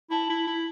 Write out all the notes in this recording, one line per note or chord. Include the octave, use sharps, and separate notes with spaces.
E4 A5
E4
E4